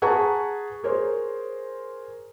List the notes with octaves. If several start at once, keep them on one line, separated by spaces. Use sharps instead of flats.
G#4 B4 F#5 A5 A#5 C#6
G#4 A#4 C5 C#5